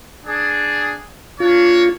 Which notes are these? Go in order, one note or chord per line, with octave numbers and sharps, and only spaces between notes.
D4 G#4
A#3 D4 F4 C#5